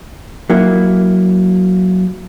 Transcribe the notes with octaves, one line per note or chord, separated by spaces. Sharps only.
F#3 A#3 E4